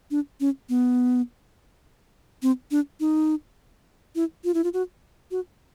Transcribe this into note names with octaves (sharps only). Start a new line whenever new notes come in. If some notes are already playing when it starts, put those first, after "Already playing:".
D4
C#4
B3
C4
D4
D#4
E4
F4
E4
F4
F#4
F#4